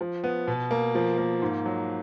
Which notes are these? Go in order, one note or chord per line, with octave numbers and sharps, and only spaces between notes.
F3
B3
B2
A#3
F3
A#3
G#2
F#3